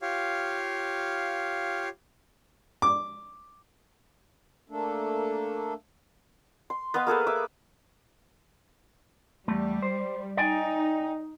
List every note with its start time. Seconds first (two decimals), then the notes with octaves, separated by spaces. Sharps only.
0.02 F4 G4 C#5 F5
2.82 D6
4.70 A3 A#3 D4 A4
6.70 C6
6.94 B3 B4 D#5 F5
7.07 A#3 G#4 A4 B4
7.27 E5 D6
9.48 E2 G3 A3
9.82 C5
10.37 D#4 D5 G5 G#5